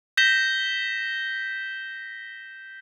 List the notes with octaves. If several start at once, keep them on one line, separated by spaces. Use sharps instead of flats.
G6 A#6 B6 E7 G7